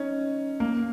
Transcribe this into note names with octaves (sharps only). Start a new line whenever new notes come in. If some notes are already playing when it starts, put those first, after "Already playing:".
Already playing: C#4 D#4
A#3